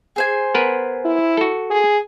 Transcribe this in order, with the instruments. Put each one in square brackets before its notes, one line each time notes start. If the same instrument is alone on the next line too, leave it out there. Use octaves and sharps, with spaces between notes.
[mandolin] G#4 C5 G#5
[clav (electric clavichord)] B3 A#4 B4
[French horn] E4
[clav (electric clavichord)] F#4 A4
[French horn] G#4